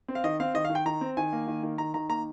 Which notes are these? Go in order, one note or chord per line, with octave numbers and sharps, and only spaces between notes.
C4
F5
D#3 D#5
C4 F5
D#3 D#5
F5
D#3
G5
D#3 A#5
C4
D#3 G#5
A#3
D#3
D#3
D#3 A#5
D#3 A#5
A#3 A#5